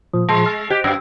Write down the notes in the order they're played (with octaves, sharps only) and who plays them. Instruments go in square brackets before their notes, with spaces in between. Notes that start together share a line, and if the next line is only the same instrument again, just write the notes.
[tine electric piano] A#2 F3 [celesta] D#6
[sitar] G#3 [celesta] A5 C6 C7
[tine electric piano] E6 [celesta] F6 A6
[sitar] G4 [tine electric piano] C5 [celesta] D#5 F#6 G#6
[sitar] F#2 [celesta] E6